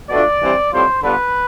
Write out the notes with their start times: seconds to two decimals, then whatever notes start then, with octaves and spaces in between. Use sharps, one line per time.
0.10 B2 A3 D4 F4 D5
0.41 G2 E3 G3 C4
0.72 A2 G3 C4 F4 C5
1.03 D3 G3 B3 F4 B4